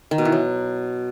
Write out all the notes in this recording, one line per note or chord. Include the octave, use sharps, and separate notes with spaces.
D#3
B2
E3
F#3